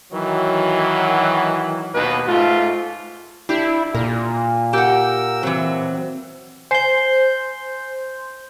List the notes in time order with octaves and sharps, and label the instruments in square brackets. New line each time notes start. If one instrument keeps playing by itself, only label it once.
[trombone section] D#3 E3 F#3
D#2 B2 D#3 B4
G#2 A3 F4
[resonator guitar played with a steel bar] D4 G4 [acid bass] E4
[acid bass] A#2 [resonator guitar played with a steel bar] A#4
[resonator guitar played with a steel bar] G4 F#5 [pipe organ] A#4 E6
[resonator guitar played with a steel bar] E3 F#3 [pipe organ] C4
[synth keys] C5 G6 [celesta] G#5 C7